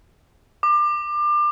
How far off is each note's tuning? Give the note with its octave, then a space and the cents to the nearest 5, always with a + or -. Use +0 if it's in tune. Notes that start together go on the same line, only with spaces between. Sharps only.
D6 +30